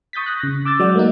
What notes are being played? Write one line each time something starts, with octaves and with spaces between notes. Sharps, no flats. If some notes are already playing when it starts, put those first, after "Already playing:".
C#6 D#6 G6 A6 B6
F#6 A#6
C#3 A#6
D6 E6 G6 A6
F#3 G#3 D5 F#5
A3 A#3 D#4